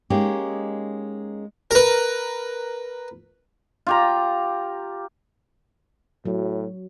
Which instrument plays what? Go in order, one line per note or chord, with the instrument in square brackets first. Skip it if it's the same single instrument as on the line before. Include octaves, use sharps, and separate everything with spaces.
[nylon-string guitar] G#3 A#3 C#4 D#4 G4
[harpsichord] A#4 B4
[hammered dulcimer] F4 G4 A#5
[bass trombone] A2 [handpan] F#3